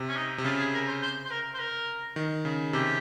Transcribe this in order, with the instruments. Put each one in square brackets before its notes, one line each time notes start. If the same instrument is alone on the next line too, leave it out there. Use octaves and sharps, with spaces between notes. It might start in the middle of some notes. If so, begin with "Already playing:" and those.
Already playing: [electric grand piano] C3
[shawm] C#4
D#4
[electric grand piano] C3
[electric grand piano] C#3 [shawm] F4
[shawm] G#4
A#4
C5
C5
C5
A#4
C5
A#4
[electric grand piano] D#3
C#3
[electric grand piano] C3 [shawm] G4